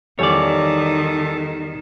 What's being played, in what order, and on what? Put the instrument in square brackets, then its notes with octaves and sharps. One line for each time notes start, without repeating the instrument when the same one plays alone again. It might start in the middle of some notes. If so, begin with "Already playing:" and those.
[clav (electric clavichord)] E2 G3 G#5 [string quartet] D#3 [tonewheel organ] A4 [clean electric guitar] C#5 D5